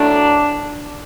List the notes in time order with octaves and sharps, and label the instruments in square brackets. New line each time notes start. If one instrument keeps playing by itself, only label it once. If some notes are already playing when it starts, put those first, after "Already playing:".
Already playing: [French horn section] A2 F#3 A3 D4